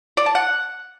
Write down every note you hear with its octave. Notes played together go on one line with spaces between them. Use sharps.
D5
A5
F#5